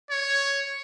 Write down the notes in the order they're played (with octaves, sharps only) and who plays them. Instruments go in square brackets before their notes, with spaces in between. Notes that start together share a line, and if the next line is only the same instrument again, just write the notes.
[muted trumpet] C#5